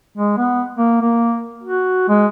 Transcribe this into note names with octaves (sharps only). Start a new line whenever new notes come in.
G#3
B3
A#3
A#3
F#4
G#3